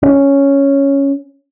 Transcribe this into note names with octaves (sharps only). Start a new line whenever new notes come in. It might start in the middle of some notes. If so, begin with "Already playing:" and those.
C#4